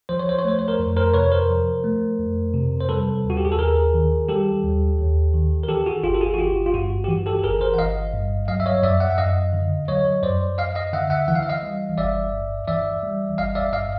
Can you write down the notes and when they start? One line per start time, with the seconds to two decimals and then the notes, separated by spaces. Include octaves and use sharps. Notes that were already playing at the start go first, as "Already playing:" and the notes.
0.09 F3 C5
0.19 C#5
0.29 C5
0.39 C#5
0.44 A3 C5
0.59 C#5
0.68 A#4 C5
0.79 F2
0.96 A#4 C5
1.14 C3 B4 C#5
1.32 A#4 C5
1.49 F3
1.84 A3
2.19 F2
2.54 C3
2.81 C5
2.89 G3 A4 B4
3.24 D#2
3.30 F#4
3.37 G4
3.45 G#4
3.52 A4
3.59 D#2 G#4 A#4
3.94 D#3
4.29 G3 G4 A4
4.64 D#2
4.99 D#2
5.34 D#3
5.63 A#4
5.68 E3 G4 A4
5.86 F#4 G#4
6.03 G1 F4 G4
6.14 A4
6.21 F#4 G#4
6.34 F#4
6.38 G1 F4 G4
6.66 F4
6.74 G2 F#4
7.04 G4
7.08 E3 F#4
7.26 G4 A4
7.39 A4
7.44 G1 G#4 A#4
7.61 A#4 C5
7.74 F#5
7.78 G1 D#5 F5
8.14 G2
8.48 F#3 D#5 F5
8.60 E5
8.66 C#5 D#5
8.83 F#2 D5 E5
9.00 E5 F#5
9.10 F#5
9.18 F#2 D#5 F5
9.53 D3
9.88 F#3 C#5 D#5
10.23 F#2 C5 D5
10.58 F#2 D#5 F5
10.75 D#5 F5
10.93 D3 E5 F#5
11.10 E5 F#5
11.28 E3 F#5
11.35 F5
11.43 E5
11.49 D#5 F5
11.63 G3
11.98 G1 D5 E5
12.33 G2
12.67 E3 D5 E5
13.03 G3
13.38 G1 D#5 F5
13.55 D5 E5
13.73 G2 D#5 F5